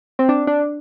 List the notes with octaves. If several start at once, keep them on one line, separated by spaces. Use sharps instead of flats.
C4
D4
D4